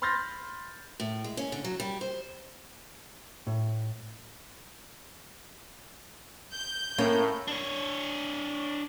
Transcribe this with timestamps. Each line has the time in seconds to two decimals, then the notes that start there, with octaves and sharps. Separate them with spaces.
0.02 B5 C6 F6 G6 A6 A#6
1.00 A2
1.24 G#3
1.37 C#4
1.52 D3
1.64 F#3
1.80 G3
2.01 C5
3.47 A2
6.53 G6
6.98 A2 A#3 C#4 A#4 C#5
7.48 D4 C#5